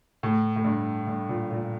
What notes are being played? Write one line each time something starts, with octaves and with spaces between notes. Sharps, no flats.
A2
A2
G2
G2
A#2
A#2